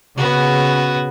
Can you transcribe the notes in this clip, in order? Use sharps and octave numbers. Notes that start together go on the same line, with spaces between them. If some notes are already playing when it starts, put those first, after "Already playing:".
C#3 B3 F#4